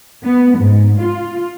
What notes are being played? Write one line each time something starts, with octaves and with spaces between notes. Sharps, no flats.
B3
G#2
F4